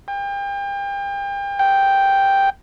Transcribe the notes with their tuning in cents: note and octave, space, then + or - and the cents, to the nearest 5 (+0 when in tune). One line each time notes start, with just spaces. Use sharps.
G5 +35
G5 +0